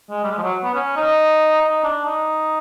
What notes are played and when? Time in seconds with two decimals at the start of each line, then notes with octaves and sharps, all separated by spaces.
0.10 G#3
0.23 G3
0.31 G#3
0.38 F3
0.42 F#3
0.64 B3
0.75 C#4
0.96 D#4
1.62 D#4
1.84 D4
2.05 D#4